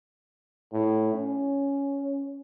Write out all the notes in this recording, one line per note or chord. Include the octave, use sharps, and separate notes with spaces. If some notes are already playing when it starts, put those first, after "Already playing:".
A2
C#4